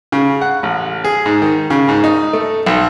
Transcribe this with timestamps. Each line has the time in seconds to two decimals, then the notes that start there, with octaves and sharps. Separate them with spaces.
0.12 C#3
0.41 F#5
0.63 A1
1.05 G#4
1.26 G#2
1.42 D#3
1.70 C#3
1.89 G#2
2.04 D#4
2.33 A3
2.66 B1